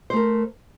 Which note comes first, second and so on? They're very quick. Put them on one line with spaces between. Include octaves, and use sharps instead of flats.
C5 A3 A#4